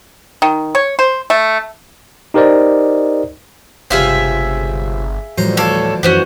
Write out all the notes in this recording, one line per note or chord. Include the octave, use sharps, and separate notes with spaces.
D#3
C#5
C5
A3
D#4 G4 A#4 C5 D5 D#5
G1 C#2 C3 C4 G#4 E5 F5
F#2 A2 E3 F3 G3 C5 A#5
D2 A4 C#5 F5 D6
F#2 E3 F3 C#4 F#4 C5 F#5